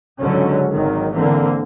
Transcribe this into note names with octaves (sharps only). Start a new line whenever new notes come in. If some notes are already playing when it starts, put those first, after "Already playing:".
C#2 G#2 D3 F#3 C#4
G#1 D#3 F#3
D3 E3 A#3 C4